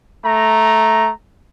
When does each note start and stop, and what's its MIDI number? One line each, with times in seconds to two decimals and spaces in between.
0.25 1.11 57
0.25 1.11 82